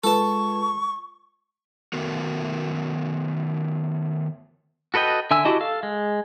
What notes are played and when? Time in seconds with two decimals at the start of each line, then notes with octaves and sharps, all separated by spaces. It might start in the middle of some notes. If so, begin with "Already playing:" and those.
0.04 G#3 F4 A4 B4 A5 C#6
1.93 D#3 A3 B3 F#4 A#4
4.94 F#4 A4 B4 D#5 G5
5.31 D3 E5 G#5 E6
5.45 E4 F#4 G4 D#5 A5
5.61 A4 F5
5.83 G#3